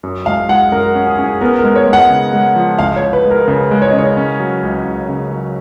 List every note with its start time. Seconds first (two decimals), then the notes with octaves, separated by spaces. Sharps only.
0.03 F#2
0.26 G#3 F5
0.49 G#3 F#5
0.72 F#2 A#4
0.95 C#4
1.07 G#4
1.18 C#4
1.24 G#4
1.41 B3 A#4
1.59 A#4
1.64 G#3
1.76 C#5
1.87 G#3
1.93 F#5
2.10 C#3
2.33 G#3
2.56 F3
2.78 C#2 F5
2.96 C#5
3.02 C#2
3.13 B4
3.25 G#3
3.30 A#4
3.47 C#3 B4
3.71 G#3
3.82 C#5
3.91 C#3 D#5
3.98 C#5
4.17 C#4
4.40 F#3
4.63 C#2
4.85 C#2
5.09 C#3
5.31 F#3